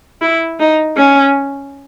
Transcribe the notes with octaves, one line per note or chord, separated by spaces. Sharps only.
E4
D#4
C#4